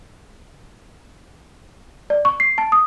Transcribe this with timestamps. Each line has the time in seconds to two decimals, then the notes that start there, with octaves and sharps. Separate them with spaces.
2.10 D5
2.25 C#6
2.40 C7
2.58 A5
2.72 D#6